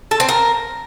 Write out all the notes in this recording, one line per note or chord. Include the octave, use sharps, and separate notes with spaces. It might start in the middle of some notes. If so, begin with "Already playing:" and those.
A4
C4
A#4